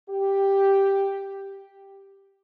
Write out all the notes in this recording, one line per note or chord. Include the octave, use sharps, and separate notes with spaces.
G4